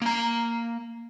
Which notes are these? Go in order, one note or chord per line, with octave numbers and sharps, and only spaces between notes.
A#3 A#5